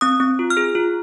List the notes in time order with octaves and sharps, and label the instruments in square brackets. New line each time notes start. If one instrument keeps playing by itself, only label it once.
[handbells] C4 D#6
C4
F4
F6
G#4
F4